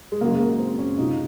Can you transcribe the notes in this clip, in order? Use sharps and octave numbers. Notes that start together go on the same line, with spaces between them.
G#3
F#1 F#2 C#3 F#3 A#3
G#3
A#3
C4
C#4
C#2 C3 F#3 D#4